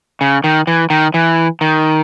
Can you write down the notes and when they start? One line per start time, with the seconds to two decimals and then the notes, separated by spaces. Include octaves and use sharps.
0.21 C#3
0.44 D#3
0.67 E3
0.90 D#3
1.14 E3
1.61 D#3